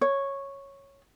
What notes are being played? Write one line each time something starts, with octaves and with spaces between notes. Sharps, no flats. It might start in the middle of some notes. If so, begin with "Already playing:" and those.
C#5